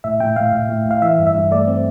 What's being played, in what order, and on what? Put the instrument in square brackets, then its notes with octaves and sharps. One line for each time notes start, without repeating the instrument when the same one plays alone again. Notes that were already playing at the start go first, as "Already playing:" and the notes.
[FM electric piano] A2 E5
A2 G5
A2 F5
A2
A2
A2 F5
E3 E5
G2
E5
G2
A3 D5
C4